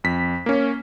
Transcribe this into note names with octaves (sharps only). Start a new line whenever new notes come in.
F2 B6
A#3 C#4